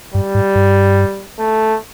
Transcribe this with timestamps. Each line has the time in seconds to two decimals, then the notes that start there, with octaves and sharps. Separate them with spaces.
0.14 G2 G3
0.35 G#2
0.55 G2
1.39 A3